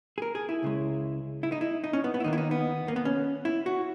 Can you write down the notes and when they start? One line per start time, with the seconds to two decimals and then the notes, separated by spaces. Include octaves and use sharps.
0.18 G#4
0.22 A#4
0.35 G#4
0.49 E4
0.62 C#2 C#3 G#3
1.43 E4
1.52 D#4
1.61 E4
1.84 D#4
1.93 C#4
2.04 B3
2.14 B3
2.20 E4
2.24 D#2 D#3 A#3 D#4
2.33 E4
2.38 D#4
2.51 B3
2.88 A#3
2.96 B3
3.05 C#4
3.45 E4
3.66 F#4